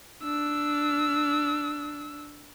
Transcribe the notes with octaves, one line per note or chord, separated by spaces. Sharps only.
D4 E6